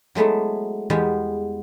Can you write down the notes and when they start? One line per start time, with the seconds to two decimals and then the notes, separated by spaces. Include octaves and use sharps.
0.15 F#3 G#3 A3 B3 E4
0.90 E2 G3 G#3 B3